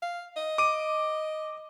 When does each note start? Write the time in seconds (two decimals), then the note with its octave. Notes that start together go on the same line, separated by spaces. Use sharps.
0.02 F5
0.37 D#5
0.58 D6 D#7